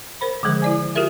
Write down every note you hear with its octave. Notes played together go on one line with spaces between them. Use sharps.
A#4 C5 B5
D3 D#3 F3 G#3 G#4 C5
E4 D5 G#5
F4 G4 G#4 A#4 E5